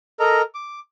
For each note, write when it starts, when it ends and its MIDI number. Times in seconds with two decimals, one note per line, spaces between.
0.20 0.42 69
0.20 0.42 70
0.20 0.42 75
0.20 0.42 82
0.55 0.80 86